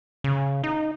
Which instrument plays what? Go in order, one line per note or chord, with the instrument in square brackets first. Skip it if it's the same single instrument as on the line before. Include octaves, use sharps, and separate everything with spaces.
[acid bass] C#3
D#4